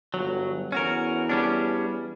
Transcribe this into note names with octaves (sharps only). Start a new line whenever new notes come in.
G1 F#3
E2 C#4 F#4 A#4
G3 C#4 D4